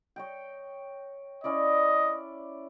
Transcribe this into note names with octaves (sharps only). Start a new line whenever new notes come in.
C#5 D#5 G5
C#4 E4 D5 D#5